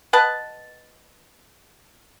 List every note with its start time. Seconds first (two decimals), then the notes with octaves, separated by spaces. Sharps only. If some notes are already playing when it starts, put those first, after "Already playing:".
0.13 B4 D#5 F#5 A5